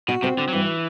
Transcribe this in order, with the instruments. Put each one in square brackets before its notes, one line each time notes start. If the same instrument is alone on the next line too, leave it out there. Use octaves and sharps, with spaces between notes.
[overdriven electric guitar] B2 [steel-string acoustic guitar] F#4
[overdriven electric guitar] C3 [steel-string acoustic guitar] C4
[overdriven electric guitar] D3 [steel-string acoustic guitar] F#4
[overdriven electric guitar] F#3
[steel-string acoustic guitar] G2 [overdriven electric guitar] E3